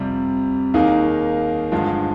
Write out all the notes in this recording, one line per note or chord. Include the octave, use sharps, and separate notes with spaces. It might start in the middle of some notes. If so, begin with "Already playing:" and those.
Already playing: F2 C3 G3
D#2 D#3 A#3 D#4 G#4
G2 D3 F3 G#3